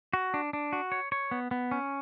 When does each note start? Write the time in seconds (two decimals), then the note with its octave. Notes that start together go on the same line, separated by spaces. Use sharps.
0.13 F#4
0.34 D4
0.53 D4
0.73 F#4
0.92 C#5
1.12 C#5
1.31 B3
1.51 B3
1.71 C#4